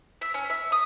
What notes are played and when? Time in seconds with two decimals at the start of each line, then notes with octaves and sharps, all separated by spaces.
0.21 E5
0.34 C#4
0.50 E5
0.72 D#6